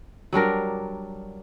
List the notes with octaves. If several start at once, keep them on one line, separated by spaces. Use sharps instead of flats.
F#3 G3 D4 A#4